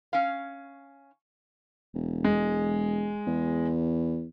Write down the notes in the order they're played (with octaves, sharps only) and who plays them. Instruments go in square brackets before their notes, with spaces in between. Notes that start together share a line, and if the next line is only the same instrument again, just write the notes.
[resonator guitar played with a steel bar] C#4 F5
[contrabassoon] E1
[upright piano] G#3
[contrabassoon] E2